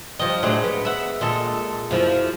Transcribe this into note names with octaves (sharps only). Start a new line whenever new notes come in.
G2 F3 D#5
A2 F#3 G#3 D4
B3
E5 F#5
A#2 G#3 A4
F#2 F3 E4